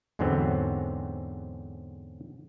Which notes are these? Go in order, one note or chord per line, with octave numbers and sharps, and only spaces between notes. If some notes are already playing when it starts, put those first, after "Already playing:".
E2 G#2 D3 F#3 B3 C4